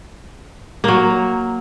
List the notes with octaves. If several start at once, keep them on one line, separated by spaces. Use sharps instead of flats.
F#3 A#3